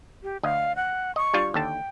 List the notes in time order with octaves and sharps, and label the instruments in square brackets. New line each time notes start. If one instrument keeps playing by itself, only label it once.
[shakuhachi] G4
[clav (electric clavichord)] D2 D#5 [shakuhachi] F5
[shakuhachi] F#5
[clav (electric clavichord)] D#5 [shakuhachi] C#6
[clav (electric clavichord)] G3 D4 F4
[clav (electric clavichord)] D#2 D3 A5 [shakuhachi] G5